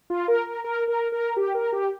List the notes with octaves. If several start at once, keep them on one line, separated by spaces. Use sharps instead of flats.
F4
A#4
A#4
A#4
A#4
A#4
G4
A#4
G4